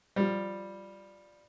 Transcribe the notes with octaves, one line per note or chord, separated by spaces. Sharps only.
F3 G3